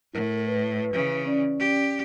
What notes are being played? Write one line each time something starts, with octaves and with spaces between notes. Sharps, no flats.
A2 E4 A#4
B4
C#3 E3
C#4 D5
G4